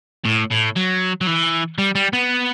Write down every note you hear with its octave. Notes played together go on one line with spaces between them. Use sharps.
A2
A2
F#3
F#3
E3
G3
G3
B3